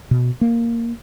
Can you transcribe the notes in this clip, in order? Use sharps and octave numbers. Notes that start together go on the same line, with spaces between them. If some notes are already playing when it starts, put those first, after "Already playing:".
B2
A#3